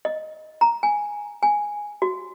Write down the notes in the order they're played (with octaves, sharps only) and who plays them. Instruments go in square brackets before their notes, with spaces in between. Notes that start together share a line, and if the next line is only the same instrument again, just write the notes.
[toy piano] D#5
A#5
G#5
G#5
F#4